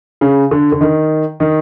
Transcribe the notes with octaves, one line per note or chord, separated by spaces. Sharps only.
C#3
D3
D3
D#3
D#3